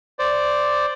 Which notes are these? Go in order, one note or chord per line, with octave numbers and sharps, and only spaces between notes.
C5 D5